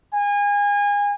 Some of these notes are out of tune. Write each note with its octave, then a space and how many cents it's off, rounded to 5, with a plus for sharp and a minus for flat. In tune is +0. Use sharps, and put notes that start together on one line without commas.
G#5 -30